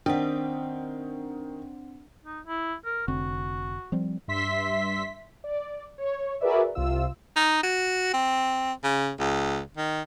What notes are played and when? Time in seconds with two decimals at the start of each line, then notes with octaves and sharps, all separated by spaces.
0.06 D#3 C4 D4 D5 F#5 G5 D#6
2.26 D#4
2.47 E4
2.85 A#4
3.08 F1 D3 C4 F#4
3.92 F3 G3 C4
4.28 G2 E5 C6 B6
5.44 D5
5.98 C#5
6.41 F#4 G#4 A#4 B4 D5 E5
6.75 C2 C3 F4 E6
7.36 D#4
7.63 F#4
8.14 C4
8.83 C#3
9.19 C#2
9.77 D#3